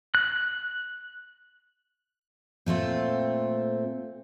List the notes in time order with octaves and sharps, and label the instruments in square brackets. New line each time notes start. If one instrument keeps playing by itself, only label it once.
[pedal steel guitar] F#6
[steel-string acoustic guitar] A#2 A3 C4 F4